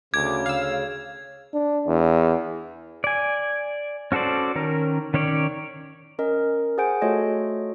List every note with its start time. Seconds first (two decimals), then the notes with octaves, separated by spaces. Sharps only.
0.14 D2 C#3 D6 G#6
0.46 D2 F5 E6
1.53 D4
1.87 E2
3.04 D5 G#5
4.12 C#4 F#4 A4 C5 D5
4.55 D#3 C#4 A#4
5.14 D#3 C#4 C#5 D5
6.19 C#4 A#4 D#5
6.78 G#4 C5 F#5 G#5 G6 D7
7.02 A3 F4 F#4 A4 C#5 D#5